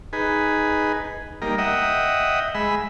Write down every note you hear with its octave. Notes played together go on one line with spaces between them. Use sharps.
D#4 G#4 B4
G3 A#3 D#4 A#4
D#5 E5 F#5 G5 D#6
G#3 B5 E6